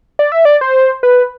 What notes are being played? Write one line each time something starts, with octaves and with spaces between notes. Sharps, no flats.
D5
E5
D5
C5
B4